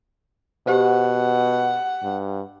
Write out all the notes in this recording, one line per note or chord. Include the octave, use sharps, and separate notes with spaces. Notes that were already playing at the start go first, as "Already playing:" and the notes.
B2 G4 C5 F#5
G2